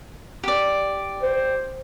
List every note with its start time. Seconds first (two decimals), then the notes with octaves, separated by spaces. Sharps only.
0.44 G4 D5
1.23 C5